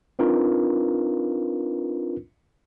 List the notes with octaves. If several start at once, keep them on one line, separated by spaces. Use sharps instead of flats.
C4 D4 D#4 F4 A#4 B4